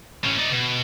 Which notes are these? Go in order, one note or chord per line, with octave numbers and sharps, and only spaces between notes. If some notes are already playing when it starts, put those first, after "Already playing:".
A2 C#4
D#4 D5
B2